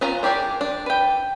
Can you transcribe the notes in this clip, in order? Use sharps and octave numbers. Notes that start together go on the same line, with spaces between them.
B3 C#4 F4 A#5
D4 G4 G#4 A#4 D5
D4
B4 G5